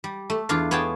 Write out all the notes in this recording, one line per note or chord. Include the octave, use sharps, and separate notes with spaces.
G3
A3
E2 D4 F4 F5
B3 G#4 C#5 G5 A5